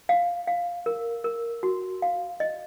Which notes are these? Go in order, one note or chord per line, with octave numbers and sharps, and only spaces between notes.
F5
F5
A#4
A#4
F#4
F5
D#5